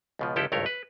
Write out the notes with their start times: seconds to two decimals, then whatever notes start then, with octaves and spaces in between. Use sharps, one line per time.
0.19 C#2 B2 F3
0.36 G1 C#2 F3 E4 G4 A4
0.52 G#1 C#2 G2 A3 A#4 C#5
0.66 B4